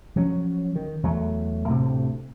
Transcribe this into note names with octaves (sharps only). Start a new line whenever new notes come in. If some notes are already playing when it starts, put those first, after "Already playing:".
F3 F#3 C#4
D#3
E2 F#3 A3
D2 A2 C3